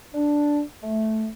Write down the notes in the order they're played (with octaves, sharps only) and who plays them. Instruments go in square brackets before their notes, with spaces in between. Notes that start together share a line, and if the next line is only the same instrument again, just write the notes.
[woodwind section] D4
A3